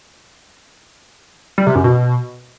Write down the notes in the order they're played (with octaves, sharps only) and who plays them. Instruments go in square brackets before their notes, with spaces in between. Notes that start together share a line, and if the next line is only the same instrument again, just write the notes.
[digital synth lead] G3
C3
F#2
B2